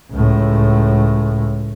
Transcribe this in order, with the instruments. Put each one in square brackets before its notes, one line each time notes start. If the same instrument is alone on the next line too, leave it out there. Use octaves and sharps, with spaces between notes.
[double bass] C#2 A2